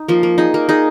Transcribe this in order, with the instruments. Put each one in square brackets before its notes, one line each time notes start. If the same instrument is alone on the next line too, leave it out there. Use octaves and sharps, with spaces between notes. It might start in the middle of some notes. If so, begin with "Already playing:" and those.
Already playing: [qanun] D#4
F3 A#3
A#3
D#4 G#4
A#3
D#4 G#4